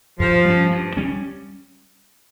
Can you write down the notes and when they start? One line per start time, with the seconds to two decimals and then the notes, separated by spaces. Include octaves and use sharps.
0.19 G2 F3
0.45 G3 C#4
0.71 G2
0.97 G3 C#4